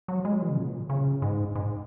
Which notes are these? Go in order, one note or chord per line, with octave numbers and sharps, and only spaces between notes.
F#3
G#3
F#3
E3
C#3
A#2
C#3
G#2
G#2